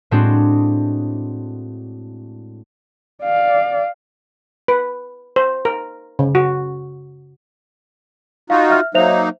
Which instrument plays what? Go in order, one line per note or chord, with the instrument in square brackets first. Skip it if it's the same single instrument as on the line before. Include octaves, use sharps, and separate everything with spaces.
[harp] A2 G#3 C4 D4 F#4
[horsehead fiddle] D5 F5
[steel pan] B4
C5
A#4
C#3
F#4
[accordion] D#4 F4 F#4 [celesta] F5
[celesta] E5 F6
[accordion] F#3 A#3 D#4 [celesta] C5 E5 F7